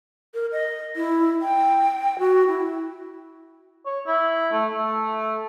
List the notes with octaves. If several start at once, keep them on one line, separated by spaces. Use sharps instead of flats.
A#4
D#5
E4
G5
F#4
E4
C#5
E4
A3
A3